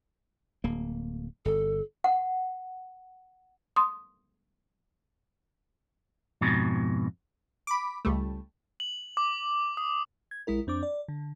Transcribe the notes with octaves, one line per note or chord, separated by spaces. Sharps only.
D1 A#3
G1 A4
F#5
C6 D#6
F2 G#2 B2
B5 D6
C#2 G3 A3
F#7
D6
D#6
G#6
A#1 G#3 E4 A#4
F2 C4 D4 D6
D5
D3